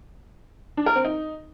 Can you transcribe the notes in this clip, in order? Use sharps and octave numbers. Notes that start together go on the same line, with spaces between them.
D4
A#4
C4
D#4